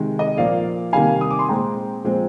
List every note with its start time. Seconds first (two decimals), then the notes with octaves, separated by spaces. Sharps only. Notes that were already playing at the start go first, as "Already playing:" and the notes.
Already playing: C3 D#3 G#3
0.19 D#5
0.37 A#2 F3 A#3 D5 F5
0.93 C3 D#3 G3 A#3 F5 G#5
1.21 D#6
1.31 D6
1.39 C6
1.49 A#2 G#3 C4 G5 A#5
2.04 A#2 F3 G#3 C4